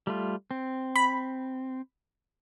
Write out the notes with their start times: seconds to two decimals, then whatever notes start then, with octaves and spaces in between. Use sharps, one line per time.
0.07 G3 A3 F4
0.51 C4
0.96 B5